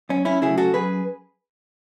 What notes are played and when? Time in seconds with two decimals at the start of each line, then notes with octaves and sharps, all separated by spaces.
0.09 F#2 C#4
0.25 C#4 E4
0.42 C#3 F#3 A3 E4 G#4
0.58 F#4 A4
0.74 F#2 G#4 B4